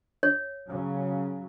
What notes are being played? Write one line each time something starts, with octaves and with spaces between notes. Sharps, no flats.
C#5
C#3 F#3